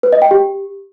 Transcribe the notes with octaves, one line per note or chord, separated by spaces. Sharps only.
B4
D#5
G5
G4